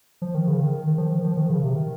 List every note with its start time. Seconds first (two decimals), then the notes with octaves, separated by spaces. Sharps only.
0.22 F3
0.35 D#3
0.47 C#3
0.61 D#3
0.87 D#3
0.98 F3
1.12 D#3
1.24 F3
1.37 D#3
1.50 C#3
1.63 C3
1.76 D#3